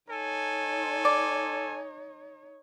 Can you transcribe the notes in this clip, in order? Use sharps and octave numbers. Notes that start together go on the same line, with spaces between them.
D#4 A4 C#5 G#5
D5